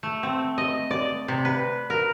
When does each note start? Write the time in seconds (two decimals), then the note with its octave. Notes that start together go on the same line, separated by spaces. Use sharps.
0.03 A3
0.23 C4
0.58 D#5
0.91 D5
1.28 C3
1.45 B4
1.90 A#4